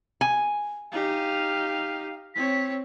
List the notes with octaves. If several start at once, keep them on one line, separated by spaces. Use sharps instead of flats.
G#5
D#4 G4 F5
C4 C#5 B6